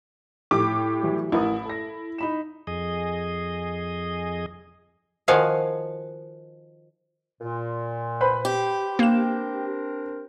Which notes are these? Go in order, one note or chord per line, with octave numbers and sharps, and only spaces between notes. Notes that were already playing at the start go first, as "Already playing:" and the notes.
A2 G4 D6
E3 F#3 G3
A1 E4 A#4 D#6
A4 A#6
D#4 B5 E7
F2 G#4 D#5
D#3 F3 F#4 F5 G#5
A#2
B4 C5 B5
G4
A#3 C4 D4 A#4 E7